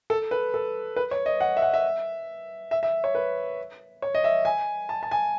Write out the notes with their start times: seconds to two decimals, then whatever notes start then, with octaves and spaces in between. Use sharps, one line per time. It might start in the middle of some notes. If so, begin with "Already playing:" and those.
0.10 A4
0.31 B4
0.54 A4
0.96 B4
1.11 C#5
1.26 D#5
1.41 F#5
1.57 E5
1.62 F#5
1.74 E5
2.71 E5
2.83 E5
3.04 C#5
3.15 B4
4.02 C#5
4.15 D#5
4.24 E5
4.45 G#5
4.89 A5
5.03 A5
5.11 G#5